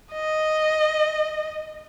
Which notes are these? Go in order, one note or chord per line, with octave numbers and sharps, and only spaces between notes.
D#5